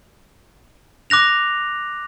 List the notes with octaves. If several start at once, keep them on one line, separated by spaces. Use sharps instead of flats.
D6 F#6 A#6 F7